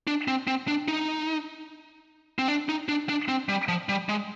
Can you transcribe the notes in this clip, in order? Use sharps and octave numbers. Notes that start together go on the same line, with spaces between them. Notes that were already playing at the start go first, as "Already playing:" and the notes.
D4
C4
C4
D4
D#4
C4
D4
D#4
D4
D4
C4
G3
F3
G3
G#3